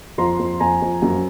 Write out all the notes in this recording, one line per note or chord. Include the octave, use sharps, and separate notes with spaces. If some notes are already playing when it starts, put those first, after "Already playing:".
F2 A#5 C6
F2
F2 G#5 A#5
F2
F#2